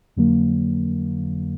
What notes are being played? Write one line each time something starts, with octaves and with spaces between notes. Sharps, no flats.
F2 D3 F#3 A#3